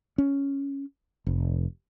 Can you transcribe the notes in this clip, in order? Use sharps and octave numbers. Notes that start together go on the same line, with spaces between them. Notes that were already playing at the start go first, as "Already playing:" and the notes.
C#4
F1